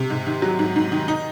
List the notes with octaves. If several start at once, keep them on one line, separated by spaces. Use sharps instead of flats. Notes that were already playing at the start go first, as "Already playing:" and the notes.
Already playing: C3
G#2
D#3
F#3
G#2
G#2
D#3
D#4